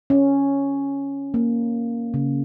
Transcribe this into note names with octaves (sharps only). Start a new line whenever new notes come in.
C#4
A#3
C#3